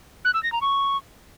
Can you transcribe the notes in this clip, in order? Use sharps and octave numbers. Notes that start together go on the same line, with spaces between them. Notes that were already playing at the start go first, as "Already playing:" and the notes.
F#6
E6
A#6
A#5
C#6